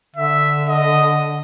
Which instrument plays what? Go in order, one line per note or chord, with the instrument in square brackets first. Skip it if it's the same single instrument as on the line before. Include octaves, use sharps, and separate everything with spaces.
[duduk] D3 [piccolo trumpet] E5
[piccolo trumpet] D#5